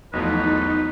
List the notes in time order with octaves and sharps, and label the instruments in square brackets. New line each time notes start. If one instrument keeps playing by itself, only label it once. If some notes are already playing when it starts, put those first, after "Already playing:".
[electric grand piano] B1 B2 A3 [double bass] E2 F3 [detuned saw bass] D#4 [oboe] B4